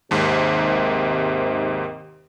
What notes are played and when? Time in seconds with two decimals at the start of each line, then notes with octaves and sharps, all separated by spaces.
0.11 D#2 G#2 C3 D#3